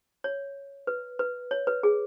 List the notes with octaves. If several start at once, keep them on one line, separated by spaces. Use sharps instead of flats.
C#5
B4
B4
C#5
B4
G#4